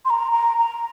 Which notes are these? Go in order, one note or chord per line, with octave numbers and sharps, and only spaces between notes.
C6
A#5
A#5
A#5